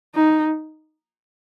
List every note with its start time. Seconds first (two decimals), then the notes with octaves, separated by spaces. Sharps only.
0.15 D#4